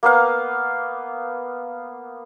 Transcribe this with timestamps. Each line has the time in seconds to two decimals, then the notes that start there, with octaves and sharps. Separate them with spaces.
0.03 A#3 B3 F5